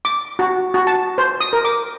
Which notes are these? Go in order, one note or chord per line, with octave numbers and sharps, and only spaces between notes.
D6
F#4
F#4
A5
C5
D#6
A#4
D6